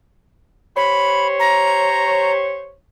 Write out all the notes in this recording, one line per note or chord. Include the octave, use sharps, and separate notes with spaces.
G4 C5 C#5 B5
A#5